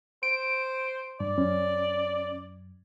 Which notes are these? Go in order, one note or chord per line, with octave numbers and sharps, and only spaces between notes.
C5 D7
G2 D5
F#2 C#4